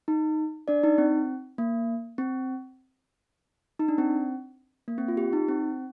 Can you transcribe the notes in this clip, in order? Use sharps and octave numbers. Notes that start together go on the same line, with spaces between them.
D#4
D4 D5
D#4
C4
A#3
C4
D#4
D4
C4
A#3
C4
F4
G4
D#4
C4